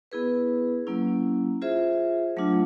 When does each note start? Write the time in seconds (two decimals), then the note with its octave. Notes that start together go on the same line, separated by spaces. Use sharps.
0.12 B3 E4 G#4 B4
0.87 F#3 A#3 C#4 E4
1.62 F4 G#4 C5 E5
2.37 F#3 A3 D4 F4